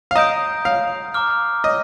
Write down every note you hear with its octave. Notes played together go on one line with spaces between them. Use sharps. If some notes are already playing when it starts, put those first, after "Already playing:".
F5
D#5 A#5 D#6 G6 D7
F5
A#5 D6 F6
D#5